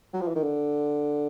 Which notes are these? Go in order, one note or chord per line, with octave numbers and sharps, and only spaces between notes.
F#3
F3
E3
D#3
D3